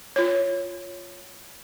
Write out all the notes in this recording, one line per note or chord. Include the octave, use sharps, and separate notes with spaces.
F4 C#5